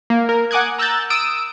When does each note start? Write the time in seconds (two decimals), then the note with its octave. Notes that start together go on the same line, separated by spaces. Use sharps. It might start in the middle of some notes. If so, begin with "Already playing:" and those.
0.10 A#3
0.29 A#4
0.51 F#5 G#5 D6 D#6 F#6 G#6
0.78 A#5 E6 F#6 G6 A6
1.10 D#6 E6 D7